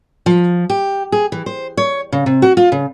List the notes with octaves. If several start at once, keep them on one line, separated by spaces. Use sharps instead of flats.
F3
G4
G#4
E3
C5
C#5
C#3
C3
F#4
F4
C#3